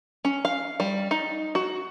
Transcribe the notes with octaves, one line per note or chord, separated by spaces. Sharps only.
C#4
F5
G3
D#4
F#4